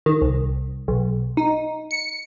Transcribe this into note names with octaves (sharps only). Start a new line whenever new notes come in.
D#3
C2
B1
D#4
C#7